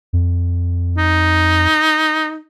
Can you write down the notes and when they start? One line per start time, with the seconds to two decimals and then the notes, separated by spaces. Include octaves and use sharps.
0.13 F2
0.98 D#4